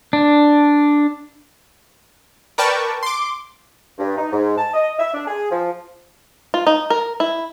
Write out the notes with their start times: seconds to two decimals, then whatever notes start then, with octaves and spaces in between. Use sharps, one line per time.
0.13 D4
2.58 A#4 B4 D5 G5 A5 C#6
3.03 C6 D6
3.99 G2
4.17 D#4
4.32 G#2
4.58 A5
4.74 D#5
4.98 E5
5.14 D4
5.27 G#4
5.51 F3
6.54 F4
6.67 D#4
6.90 A#4
7.20 E4